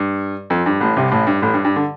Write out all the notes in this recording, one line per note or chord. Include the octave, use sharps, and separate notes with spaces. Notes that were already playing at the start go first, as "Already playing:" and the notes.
Already playing: G2
F2
G2
A1 A2
C2 C3
A1 A2
G2
A1 A2
G2
G2
D3